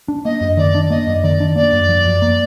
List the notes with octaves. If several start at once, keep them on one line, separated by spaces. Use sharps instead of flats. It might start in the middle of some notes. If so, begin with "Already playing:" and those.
D4
A#3 D#5
F#2
D#3 D5
D4
A#3 D#5
F#2
D#3 D5
D4
A#3 D5
F#2
F3
F#2
A#3